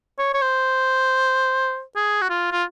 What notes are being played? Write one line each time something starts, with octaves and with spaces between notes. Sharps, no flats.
C#5
C#5
C5
G#4
F#4
F4
F4